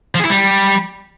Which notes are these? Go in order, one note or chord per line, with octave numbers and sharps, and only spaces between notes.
F3
G#4
E4
G3